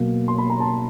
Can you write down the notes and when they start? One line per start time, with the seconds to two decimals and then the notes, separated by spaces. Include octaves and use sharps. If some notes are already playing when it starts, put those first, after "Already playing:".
Already playing: B2 F#3 A#3
0.28 C6
0.38 B5
0.50 A#5
0.60 A5